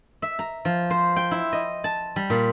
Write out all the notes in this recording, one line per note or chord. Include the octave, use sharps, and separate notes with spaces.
E5
A#5
F3
C5
G5
E4
D#5
A5
G3
A#2